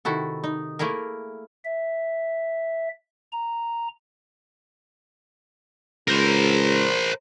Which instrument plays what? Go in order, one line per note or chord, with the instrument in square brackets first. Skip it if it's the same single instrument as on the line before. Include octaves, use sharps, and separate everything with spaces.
[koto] C3 D#3 E4 F#4 A4
D#4
A3 A#3 E4 G#4 A#4
[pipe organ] E5
A#5
[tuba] C#2 [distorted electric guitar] A#4 C5